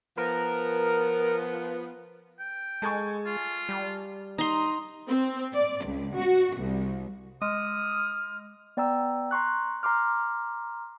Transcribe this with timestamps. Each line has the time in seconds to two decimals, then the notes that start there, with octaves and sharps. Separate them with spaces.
0.17 F3 B3 A#4
2.39 G5
2.82 G#3 A4 G#5 C#6
3.26 F4
3.69 G3
4.38 D#4 A#5 C6 D#6
5.08 C4
5.54 D5
5.85 C#2
6.17 F#4
6.59 C2
7.42 G#3 D#6 F6
8.77 B3 D5 G5 A#5 E6
9.31 A#5 C6 C#6 F#6
9.83 A#5 C6 D6 F6